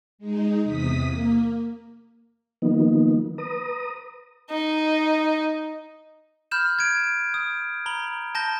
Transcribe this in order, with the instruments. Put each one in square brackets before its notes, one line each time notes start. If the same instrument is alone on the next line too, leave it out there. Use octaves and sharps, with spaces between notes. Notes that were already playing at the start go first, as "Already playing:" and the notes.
[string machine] G#3 D#4
E2 C3 D#6 B6
A#3
[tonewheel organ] D#3 F3 F#3 A#3 B3 D#4
B4 A#5 D#6
[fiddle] D#4
[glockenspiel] B5 F6 G6 E7
G#6 D7
D#6
A#5 B5 G7
A5 G6 A#6 G7